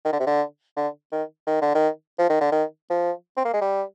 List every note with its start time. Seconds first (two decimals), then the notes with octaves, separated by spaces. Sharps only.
0.05 D#3
0.13 D3
0.20 C3
0.27 D3
0.77 D3
1.12 D#3
1.47 D#3
1.61 D3
1.75 D#3
2.19 F3
2.29 D#3
2.41 D3
2.52 D#3
2.90 F3
3.37 C4
3.45 A#3
3.53 G#3
3.61 G3